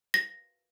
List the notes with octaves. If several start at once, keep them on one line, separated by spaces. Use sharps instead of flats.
A#6